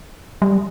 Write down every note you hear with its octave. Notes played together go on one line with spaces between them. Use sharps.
G3